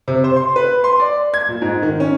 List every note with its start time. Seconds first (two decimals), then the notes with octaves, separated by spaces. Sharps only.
0.08 C3
0.24 C5
0.36 C6
0.56 B4
0.84 C6
1.00 D5
1.34 G#6
1.49 A#2
1.62 G#2
1.82 D#3
2.00 C#4